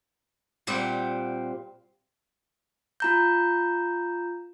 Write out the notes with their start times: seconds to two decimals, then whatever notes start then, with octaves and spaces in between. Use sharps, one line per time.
0.67 A#2 G3 C4 F#5
3.00 F4 A#5 G6